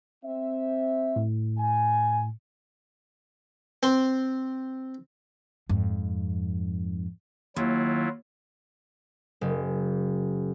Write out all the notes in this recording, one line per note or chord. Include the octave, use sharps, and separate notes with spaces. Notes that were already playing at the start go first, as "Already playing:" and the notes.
C4 E5
A2
G#5
C4 C6
F2 G#2
D#2 F#3 E4 F4
F#1